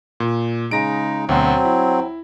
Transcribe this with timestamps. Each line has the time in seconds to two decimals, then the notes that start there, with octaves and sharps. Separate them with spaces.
0.20 A#2
0.71 C#3 G#3 D#4 A#5 A#6 D7
1.29 D2 B2 F#3 C4 C5
1.65 E4